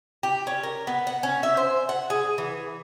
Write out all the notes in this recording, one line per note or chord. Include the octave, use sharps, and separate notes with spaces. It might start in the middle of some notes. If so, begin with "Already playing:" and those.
G4
C#4
A#4
B3
F#5
C#4
E5
C5
F#5
G#4
E3